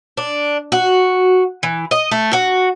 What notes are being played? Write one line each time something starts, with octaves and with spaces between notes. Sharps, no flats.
D4
F#4
E3
D#5
A3
F#4